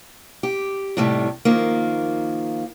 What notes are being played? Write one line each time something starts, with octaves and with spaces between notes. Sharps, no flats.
G4
D#2 A2 C3 G3 A3
D#3 F3 A#3